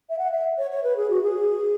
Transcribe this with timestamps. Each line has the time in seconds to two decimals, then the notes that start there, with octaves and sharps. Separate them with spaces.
0.10 E5
0.18 F#5
0.32 E5
0.58 C#5
0.71 C#5
0.84 B4
0.97 G#4
1.10 F#4
1.23 G#4